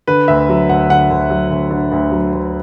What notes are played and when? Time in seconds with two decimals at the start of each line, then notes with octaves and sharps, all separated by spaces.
0.07 D3 B4
0.28 D2 E5
0.49 F#3
0.69 D2 F#5
0.90 D3 F#5
1.11 D2
1.30 F#3
1.51 D2
1.71 D3
1.92 D2
2.11 F#3
2.33 D2